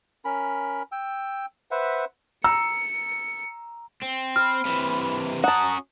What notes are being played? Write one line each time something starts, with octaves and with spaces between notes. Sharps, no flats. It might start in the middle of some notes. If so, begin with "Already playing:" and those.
C#4 A#4 B5
G5 E6
B4 C5 E5 F#5
A#5 E6 C#7
C4
B5 F6
C3 E3
C#4 F#4 F#5 A5 A#5 D#6